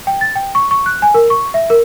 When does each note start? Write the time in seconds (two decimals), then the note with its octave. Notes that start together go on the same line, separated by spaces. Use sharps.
0.07 G5
0.21 A6
0.35 G5
0.55 C#6
0.71 C#6
0.86 F#6
1.02 G#5
1.14 A#4
1.30 C#6
1.54 E5
1.70 A#4